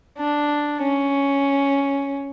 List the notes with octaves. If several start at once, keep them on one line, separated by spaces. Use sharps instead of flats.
D4
C#4